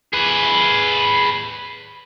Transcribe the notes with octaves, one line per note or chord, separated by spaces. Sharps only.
G#4 B4